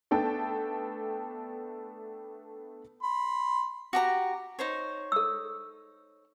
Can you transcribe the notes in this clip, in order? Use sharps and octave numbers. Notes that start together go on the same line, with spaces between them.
A3 B3 D4 A4 G5 A5
B5 C6
F#4 G4 A#5
D#4 C5 C#5
A4 E6